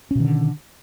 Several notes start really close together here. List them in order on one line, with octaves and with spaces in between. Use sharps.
C#4 B2 D#3 D3